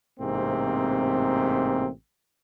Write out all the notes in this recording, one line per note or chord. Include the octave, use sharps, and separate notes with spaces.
A1 G#2 C3 A#3 C4